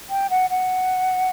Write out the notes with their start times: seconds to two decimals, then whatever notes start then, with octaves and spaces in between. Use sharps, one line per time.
0.09 G5
0.30 F#5
0.50 F#5